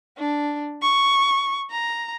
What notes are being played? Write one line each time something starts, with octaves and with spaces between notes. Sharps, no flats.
D4
C#6
A#5